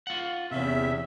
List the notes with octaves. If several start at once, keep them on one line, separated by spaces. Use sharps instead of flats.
F4 F#5
E2 C3 C#4 E5